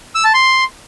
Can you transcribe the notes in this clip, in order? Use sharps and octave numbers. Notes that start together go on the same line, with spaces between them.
E6
A5
C6